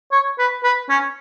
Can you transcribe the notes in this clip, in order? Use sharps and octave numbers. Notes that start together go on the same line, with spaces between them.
C#5
B4
B4
C#4